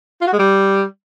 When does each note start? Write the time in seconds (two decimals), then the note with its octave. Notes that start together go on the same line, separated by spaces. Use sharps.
0.21 F4
0.27 F#4
0.33 G#3
0.39 G3